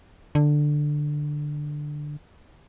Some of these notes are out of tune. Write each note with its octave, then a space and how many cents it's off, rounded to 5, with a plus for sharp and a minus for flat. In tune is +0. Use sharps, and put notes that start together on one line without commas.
D3 +10